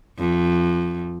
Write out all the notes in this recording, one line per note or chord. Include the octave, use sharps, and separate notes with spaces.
F2